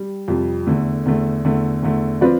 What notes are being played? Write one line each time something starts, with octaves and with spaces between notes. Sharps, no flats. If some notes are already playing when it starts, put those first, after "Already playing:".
Already playing: G3
F2 C3 G3
E2 D3 A3
E2 D3 A3
E2 D3 A3
E2 D3 A3
F3 C4 F4 B4 D5